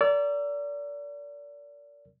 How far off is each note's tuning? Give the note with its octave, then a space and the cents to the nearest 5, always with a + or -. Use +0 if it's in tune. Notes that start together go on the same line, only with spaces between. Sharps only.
A#4 -10 D5 -30 E6 +40